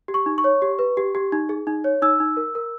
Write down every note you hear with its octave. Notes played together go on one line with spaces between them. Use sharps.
G4
C#6
D#4
C#6
C#5
G4
B4
G4
G4
D#4
G#4
D#4
C#5
D#4 E6
D#4
A#4
A#4